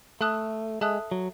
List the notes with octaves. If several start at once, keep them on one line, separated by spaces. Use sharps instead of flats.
A3 A4 E5 A5 D#6 F#6
G#3 A4 E5 A5 D#6 F#6
F#3